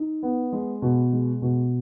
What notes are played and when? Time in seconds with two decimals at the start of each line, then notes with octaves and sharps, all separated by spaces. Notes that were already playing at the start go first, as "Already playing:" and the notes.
Already playing: D#4
0.23 B3
0.53 G#3
0.82 B2
1.13 G#3
1.42 B2